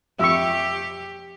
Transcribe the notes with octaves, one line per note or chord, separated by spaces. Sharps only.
F2 G4 E5 C#6 E6